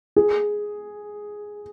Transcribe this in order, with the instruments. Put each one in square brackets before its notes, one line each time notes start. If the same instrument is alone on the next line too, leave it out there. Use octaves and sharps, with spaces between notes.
[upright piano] G#4